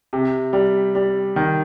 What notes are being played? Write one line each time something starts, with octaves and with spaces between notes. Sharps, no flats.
C3
G3
G3
D#3